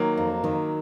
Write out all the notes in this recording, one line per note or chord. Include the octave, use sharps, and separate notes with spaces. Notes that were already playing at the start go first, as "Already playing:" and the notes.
Already playing: D#3 F#3 A#3
F2
D#3